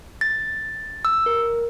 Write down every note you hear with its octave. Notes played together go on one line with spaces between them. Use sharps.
A6
E6
A#4